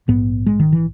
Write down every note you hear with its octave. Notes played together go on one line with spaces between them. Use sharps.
A#1 G#2 B3
G#3
D#3
E3